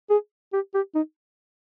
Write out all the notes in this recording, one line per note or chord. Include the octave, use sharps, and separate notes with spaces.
G#4
G4
G4
D#4